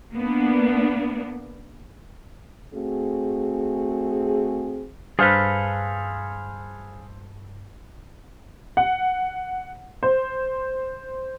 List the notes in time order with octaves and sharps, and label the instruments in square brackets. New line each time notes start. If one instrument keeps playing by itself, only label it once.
[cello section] A#3 B3 D4
[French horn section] A3 C4 F#4 G#4
[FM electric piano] G2 [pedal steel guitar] G#4 F5 [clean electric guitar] A4 B4 [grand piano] C5 F6 G6
[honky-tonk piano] F#5
C5